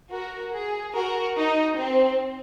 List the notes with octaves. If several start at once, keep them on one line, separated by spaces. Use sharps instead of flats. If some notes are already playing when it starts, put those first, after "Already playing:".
F#4 A#4
G#4
F#4 A#4
D#4
C4